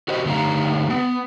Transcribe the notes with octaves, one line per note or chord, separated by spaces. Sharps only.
F#4 G4 C5 D#5
D3 A3 D#4 G4 F5 A#5
B3